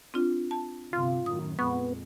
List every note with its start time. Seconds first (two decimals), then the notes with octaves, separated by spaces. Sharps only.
0.14 C4 D4 F4
0.51 A5
0.93 G1 C3 F4
1.26 F#2 A2 D#3 D#6
1.59 F2 A#2 G#3 B3 C#6